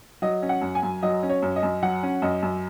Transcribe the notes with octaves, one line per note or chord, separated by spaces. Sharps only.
F#3 D#5
C#4
F#5
F#2
G#5
F#2
F#3 D#5
C#4
C#5
F#2
D#5
F#2
F#3 F#5
C#4
F#2 D#5
F#2